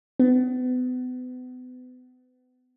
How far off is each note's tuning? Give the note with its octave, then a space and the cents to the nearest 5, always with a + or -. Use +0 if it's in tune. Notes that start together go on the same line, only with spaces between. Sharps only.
B3 +35